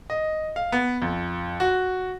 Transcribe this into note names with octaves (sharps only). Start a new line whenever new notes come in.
D#5
F5
B3
F2
F#4